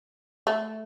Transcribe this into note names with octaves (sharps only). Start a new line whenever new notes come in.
A3